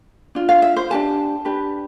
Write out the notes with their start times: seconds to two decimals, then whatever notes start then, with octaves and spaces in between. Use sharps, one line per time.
0.35 D4 F4
0.49 F5
0.62 E5
0.76 C5
0.90 D4 G4 B4 A5
1.45 D4 G4 B4